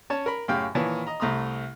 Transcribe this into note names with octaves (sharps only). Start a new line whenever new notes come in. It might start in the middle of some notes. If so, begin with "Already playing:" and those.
C#4 C#5 A5
A#4 B5
F#2 A2 C#3 G4 F5 G5
A#2 D#3 E3 C#5 A5
D#5 A#5
C2 A3 A#5 C6 D#6